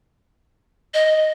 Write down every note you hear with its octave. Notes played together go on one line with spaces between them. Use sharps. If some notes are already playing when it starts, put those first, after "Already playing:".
D#5